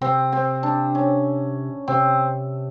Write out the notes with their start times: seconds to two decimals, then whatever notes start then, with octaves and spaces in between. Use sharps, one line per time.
0.01 C3 C4
0.32 C4
0.63 D4
0.95 C#4
1.88 C3 C4